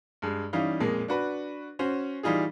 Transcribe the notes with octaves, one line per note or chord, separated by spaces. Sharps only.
G2 G#3
E3 G3 C#4 D#4 F5
F2 A#2 G#3 A#3
D4 F#4 B4
C#4 F#4 C5
E3 G3 D#4 F4 G#4